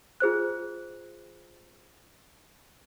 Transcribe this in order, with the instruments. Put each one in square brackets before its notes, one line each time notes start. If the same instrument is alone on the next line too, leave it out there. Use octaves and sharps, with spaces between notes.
[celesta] F4 G#4 C5 F#6